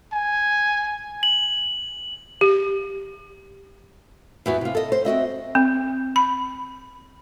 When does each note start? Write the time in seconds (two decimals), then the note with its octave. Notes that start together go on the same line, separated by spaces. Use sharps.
0.13 G#5
1.23 F#7
2.41 G4
4.46 E2 E3 F#4
4.61 C3 F4
4.75 A4 D#5
4.92 C5
5.05 C4 F#4 D#5 E5
5.55 C4
6.16 B5